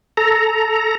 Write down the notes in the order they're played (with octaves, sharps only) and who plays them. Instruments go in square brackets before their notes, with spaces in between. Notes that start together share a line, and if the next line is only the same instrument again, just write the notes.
[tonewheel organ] A4 A#5